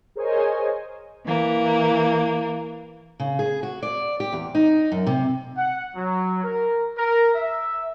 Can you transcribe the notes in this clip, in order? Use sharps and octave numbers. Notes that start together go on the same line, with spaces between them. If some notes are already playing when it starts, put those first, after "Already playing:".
G#4 A#4 C5 C#5 D#5 G#5
E3 A#3
C#3
G#4
F#4
D5
G4
E2
D#4
F#2
C3
F#5
F#3
A#4
A#4
E5